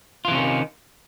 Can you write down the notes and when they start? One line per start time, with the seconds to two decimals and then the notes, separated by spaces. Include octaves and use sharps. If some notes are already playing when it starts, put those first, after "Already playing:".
0.25 F4
0.28 E3
0.31 C3
0.34 C#4
0.37 D#3